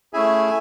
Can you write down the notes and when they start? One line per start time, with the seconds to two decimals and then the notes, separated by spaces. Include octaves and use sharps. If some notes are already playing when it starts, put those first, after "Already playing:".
0.13 A3 C#4 E4 G#4 E5 G#5